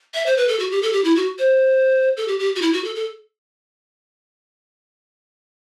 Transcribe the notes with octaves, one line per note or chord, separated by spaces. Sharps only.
E5
C5
B4
A4
F#4
G4
A4
G4
E4
F#4
C5
A4
G4
G4
F#4
E4
F#4
A4
A4